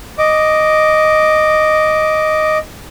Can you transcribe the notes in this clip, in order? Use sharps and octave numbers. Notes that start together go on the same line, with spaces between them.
D#5 D6